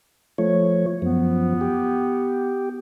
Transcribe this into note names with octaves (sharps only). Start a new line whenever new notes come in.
F3 A3 C#5
F#2 F3 B3
G4